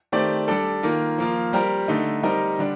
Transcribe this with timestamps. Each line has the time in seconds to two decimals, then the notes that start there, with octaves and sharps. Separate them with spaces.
0.12 D#3 A3 C4 G4 D5
0.48 G3 D4 A4
0.83 D#3 A#3 F4
1.18 F3 A#3 F4
1.53 G3 C4 G4 A#4
1.88 D3 A3 D#4
2.23 G3 C4 D#4 G4 A#4
2.59 D3 G3 D4